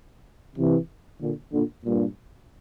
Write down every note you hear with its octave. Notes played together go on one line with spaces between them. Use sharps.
C3 E3
A#2 D3
A#2 D3
G2 A#2